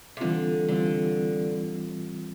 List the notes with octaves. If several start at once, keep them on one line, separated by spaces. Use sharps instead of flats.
C3
D3 E3 G3 C4 F4
D3 E3 G3 C4 F4